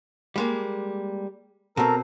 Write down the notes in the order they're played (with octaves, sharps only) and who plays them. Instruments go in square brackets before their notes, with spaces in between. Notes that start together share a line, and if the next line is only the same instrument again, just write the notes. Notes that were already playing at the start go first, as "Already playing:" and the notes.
[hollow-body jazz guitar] G3 G#3 A#3
[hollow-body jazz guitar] B2 C4 [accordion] A4 A#4 A#5